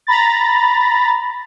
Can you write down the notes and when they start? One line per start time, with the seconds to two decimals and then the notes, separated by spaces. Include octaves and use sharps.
0.07 A#5 B5 A6